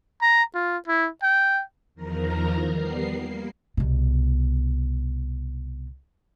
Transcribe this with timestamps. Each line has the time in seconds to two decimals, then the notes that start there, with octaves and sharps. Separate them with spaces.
0.22 A#5
0.55 F4
0.88 E4
1.23 G5
1.95 E2 D#3 F3 A#4 A#5
2.70 G3 B3 C7
3.14 A#3
3.77 C2 B2